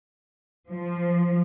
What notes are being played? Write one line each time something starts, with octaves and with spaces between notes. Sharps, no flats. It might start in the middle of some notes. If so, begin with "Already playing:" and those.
F3